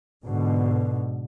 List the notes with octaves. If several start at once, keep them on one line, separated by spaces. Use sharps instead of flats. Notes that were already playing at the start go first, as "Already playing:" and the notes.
G#2 B2 D3